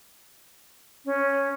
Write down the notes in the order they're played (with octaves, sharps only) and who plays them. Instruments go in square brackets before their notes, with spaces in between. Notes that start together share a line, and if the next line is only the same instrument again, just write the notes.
[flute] C#4